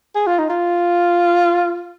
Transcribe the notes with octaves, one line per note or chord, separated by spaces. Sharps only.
G#4
F4
D#4
F4